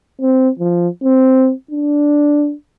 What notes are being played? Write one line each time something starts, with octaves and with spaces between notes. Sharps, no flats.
C4
F3
C4
D4